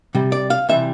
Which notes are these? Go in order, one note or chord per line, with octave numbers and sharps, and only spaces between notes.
C3 G3
D5
F5
C3 E3 G3 E5